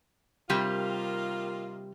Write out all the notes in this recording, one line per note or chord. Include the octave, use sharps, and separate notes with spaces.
C3 D#3 G3 A#3 F4 G4